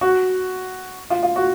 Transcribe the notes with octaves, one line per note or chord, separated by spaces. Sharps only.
F#4
F4
F4
F#4